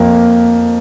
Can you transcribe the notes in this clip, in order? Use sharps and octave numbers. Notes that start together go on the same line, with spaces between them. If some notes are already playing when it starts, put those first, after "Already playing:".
Already playing: F2 A#3